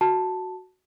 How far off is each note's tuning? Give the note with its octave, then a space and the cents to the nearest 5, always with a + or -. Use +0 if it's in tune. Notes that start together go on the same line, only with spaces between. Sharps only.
F#4 +0 A5 +0